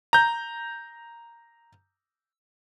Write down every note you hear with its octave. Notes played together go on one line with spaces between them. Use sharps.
A#5 G6